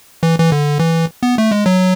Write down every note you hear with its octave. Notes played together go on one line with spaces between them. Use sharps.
E3
E3
D3
E3
B3
A3
G#3
F#3